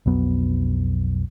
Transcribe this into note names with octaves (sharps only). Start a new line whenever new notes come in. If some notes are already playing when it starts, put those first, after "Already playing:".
B1 F2 F#3 B3